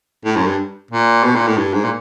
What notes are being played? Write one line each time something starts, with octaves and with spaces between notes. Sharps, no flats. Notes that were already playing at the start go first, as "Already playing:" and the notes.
A2
F#2
G2
A#2
B2
A#2
A2
G2
G#2
A#2